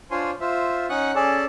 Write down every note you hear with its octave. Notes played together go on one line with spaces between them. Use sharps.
D4 F4 C5 C#5 G#5 C6
F4 C5 E5
C#4 D#4 F#5 C#6 D#6 F#6
C#4 G#4 A4 D5 A5